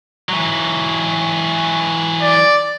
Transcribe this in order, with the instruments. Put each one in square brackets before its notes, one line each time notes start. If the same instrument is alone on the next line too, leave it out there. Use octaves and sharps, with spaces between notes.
[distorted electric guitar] E3 F#3
[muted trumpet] D5